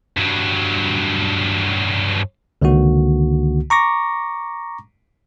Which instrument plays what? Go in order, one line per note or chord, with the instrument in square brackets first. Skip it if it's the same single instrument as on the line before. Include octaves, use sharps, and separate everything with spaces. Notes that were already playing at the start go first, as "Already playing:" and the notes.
[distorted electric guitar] G2 F#3
[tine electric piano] C#2 D3 D#3 A#3 F#4
A#5 C#6 D6 A#6